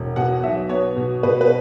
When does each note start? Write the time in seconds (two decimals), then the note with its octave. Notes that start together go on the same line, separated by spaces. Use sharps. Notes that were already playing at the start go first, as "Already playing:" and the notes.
Already playing: E1
0.16 B2 F#5
0.43 B1 E5
0.69 B3 C#5
0.96 B2
1.23 B2 B4
1.41 B4